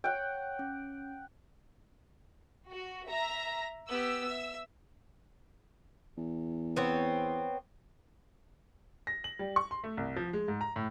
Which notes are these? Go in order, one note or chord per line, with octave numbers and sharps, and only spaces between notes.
C#5 F#5 G5
C#4
F#4
E5 A#5 A#6
B3 G4 E6
E5
E2
B3 C4 C#5
A#6
F#7
G3
C#6
C6
A3
C2
F3
G#3
G#2
A#5
A2